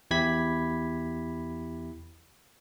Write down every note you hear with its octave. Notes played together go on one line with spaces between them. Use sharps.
E2 E4 G4 B5 G#6 B6